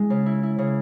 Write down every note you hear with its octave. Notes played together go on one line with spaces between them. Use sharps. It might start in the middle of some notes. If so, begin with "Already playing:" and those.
Already playing: G#3 E4
C#3
E4
E4
C#3